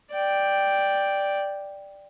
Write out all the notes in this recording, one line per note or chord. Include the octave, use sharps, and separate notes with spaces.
D5 G5